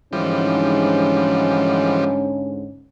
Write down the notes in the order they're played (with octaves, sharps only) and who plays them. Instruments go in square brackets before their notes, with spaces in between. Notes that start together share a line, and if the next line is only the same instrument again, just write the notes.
[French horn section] G#2 D3 [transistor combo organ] E3 F3 G3 [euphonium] C#4